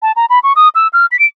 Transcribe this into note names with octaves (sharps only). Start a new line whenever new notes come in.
A5
A#5
B5
C#6
D#6
E6
F6
B6
D7